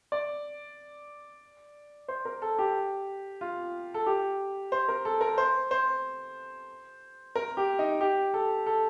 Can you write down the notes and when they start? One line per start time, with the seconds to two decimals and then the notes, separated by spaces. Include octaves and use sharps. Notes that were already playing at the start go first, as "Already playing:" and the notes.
0.12 D5
2.08 C5
2.25 A#4
2.42 A4
2.58 G4
3.41 F4
3.94 A4
4.06 G4
4.72 C5
4.88 A#4
5.05 A4
5.21 A#4
5.38 C5
5.71 C5
7.35 A#4
7.57 G4
7.79 D#4
8.01 G4
8.34 A4
8.66 A4